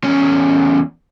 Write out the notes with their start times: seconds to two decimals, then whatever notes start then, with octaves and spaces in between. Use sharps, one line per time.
0.04 E2 C#4